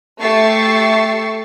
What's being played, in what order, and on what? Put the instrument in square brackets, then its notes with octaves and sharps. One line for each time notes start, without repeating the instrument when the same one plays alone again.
[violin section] A3 G4 E5 C#6 A6 C7